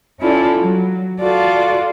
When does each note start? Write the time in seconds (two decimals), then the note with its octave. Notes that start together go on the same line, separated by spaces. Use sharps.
0.19 C#4 E4 F4 A4 D5
0.58 F#3
1.20 F4 F#4 A4 D5